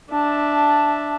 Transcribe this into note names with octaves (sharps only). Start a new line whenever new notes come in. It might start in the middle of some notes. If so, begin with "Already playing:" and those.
D4 E5 A5